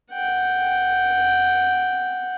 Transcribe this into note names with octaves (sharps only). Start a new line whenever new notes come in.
F#5 G5